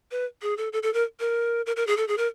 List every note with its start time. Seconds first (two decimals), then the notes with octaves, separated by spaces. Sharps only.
0.11 B4
0.42 G#4
0.57 A4
0.73 A4
0.83 A4
0.94 A#4
1.20 A#4
1.66 A#4
1.76 A#4
1.87 G#4
1.97 A4
2.08 G#4
2.17 A#4